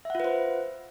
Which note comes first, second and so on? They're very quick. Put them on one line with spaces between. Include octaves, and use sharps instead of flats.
E5 F#5 F4 B4 C5